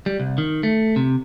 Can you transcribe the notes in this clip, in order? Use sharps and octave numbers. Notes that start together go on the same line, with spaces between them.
G3
C2
D#3
A3
C3